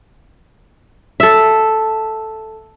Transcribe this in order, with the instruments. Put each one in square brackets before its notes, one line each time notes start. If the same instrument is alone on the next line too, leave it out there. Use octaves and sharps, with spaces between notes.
[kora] A4 E5